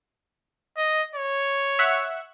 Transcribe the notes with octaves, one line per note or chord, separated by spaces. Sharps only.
D#5
C#5
E5 F#5 C#6